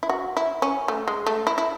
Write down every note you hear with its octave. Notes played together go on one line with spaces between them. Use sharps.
E4
F#4
E4
C#4
A3
G#3
A3
E4
E4